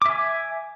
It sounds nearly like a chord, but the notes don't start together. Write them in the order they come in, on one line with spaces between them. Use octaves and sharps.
D6 E5 G#5